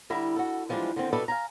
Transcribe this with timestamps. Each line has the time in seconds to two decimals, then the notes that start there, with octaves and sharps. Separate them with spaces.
0.10 D3 G3 E4 A#5
0.36 F#4 A4
0.69 E3 F3 G3 G#3 D4
0.96 D3 D#3 C4
1.13 B2 G3 A4 B4 D5 E5
1.28 F5 G#5 A#5